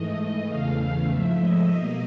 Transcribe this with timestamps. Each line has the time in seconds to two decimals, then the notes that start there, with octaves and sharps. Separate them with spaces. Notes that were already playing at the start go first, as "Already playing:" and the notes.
Already playing: G#2 E3 A3 D#5
0.47 E2 C#3 E3 A3 F5
1.08 G#2 F3 A3 E5
1.38 D#5
1.69 B2 G3 A#3